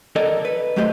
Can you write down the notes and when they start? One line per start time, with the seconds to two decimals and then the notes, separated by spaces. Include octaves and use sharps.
0.16 A4 A#4 D5 D#5
0.45 B4
0.76 D#2 F#3 A3 G4 C5 D#5